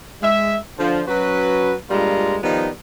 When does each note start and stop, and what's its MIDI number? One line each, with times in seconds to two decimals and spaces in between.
0.22 0.56 56
0.22 0.56 76
0.78 1.01 50
0.78 1.01 53
1.08 1.74 54
1.08 1.74 61
1.08 1.74 66
1.08 1.74 71
1.90 2.37 43
1.90 2.37 46
1.90 2.37 55
1.90 2.37 56
1.90 2.37 65
1.90 2.37 82
2.43 2.68 51
2.43 2.68 53
2.43 2.68 55
2.43 2.68 59
2.43 2.68 63